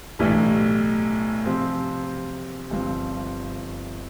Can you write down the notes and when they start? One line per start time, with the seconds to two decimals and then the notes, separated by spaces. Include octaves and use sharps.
0.19 B1 A2 E3 G3 D4
1.45 C3 F3 C4
2.70 G1 G2 F3 C4